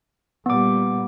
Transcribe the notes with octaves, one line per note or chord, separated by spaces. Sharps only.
A#2 G3 B3 D6